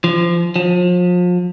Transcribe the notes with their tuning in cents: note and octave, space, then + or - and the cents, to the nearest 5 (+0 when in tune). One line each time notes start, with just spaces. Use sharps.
F3 -25
F3 +35